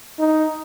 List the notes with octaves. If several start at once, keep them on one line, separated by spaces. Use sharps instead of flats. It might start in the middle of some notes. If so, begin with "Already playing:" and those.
D#4